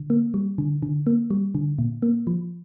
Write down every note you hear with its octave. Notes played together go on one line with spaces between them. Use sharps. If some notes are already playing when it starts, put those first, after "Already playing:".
Already playing: D3
A#3
G3
D3
D3
A#3
G3
D3
A#2
A#3
F3